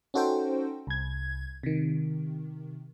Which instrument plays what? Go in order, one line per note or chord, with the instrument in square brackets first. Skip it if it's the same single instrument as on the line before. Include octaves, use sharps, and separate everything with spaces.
[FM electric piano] C#4 D#4 F#4 A4 C5 G5
C2 G#6
C3 D#3